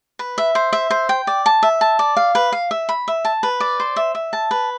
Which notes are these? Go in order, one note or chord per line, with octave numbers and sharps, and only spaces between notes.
B4
E5
C5
E5
C5
G5
D5
A5
E5
A5
D5
F5
B4
F5
E5
B5
E5
A5
B4
D5
C5
E5
E5
A5
B4